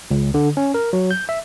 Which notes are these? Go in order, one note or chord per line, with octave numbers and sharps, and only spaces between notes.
C#2
D3
C#4
A#4
F#3
G6
E5